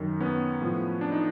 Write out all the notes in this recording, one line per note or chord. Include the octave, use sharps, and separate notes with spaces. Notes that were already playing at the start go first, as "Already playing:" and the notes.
Already playing: F#2 D#3
B3 C#4
A2 F3
D4
D#4